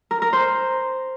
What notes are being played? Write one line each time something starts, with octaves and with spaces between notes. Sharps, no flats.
A#4
A#4
C5